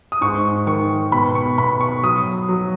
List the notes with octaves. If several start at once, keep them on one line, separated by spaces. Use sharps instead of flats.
D#6
G#2 C#6
D#3 C#6
B2 B5
C#6
B2 B5
C#6
F#3 D#6
F#3